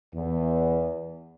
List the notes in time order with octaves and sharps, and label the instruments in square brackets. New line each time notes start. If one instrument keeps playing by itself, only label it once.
[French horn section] E2